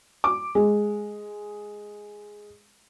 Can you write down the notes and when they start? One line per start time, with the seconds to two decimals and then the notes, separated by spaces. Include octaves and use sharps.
0.24 D6
0.55 G#3